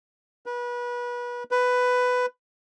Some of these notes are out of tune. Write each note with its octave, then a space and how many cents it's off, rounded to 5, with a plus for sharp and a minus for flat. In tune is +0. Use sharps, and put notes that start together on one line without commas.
B4 -30
B4 +10